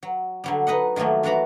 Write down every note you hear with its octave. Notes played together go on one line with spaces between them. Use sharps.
F#3
D3 F#3 G3
D#4 B4 D#5 F#5
D#3 F3 F#3 A3 A#3
E3 D4 F#4 A#5 B5